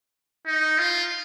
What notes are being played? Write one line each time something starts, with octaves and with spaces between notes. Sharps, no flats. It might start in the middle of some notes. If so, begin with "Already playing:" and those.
D#4
F4